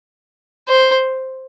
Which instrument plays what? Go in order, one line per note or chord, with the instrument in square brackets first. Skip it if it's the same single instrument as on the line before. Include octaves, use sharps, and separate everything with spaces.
[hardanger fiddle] C5